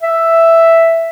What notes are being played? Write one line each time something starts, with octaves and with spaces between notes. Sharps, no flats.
E5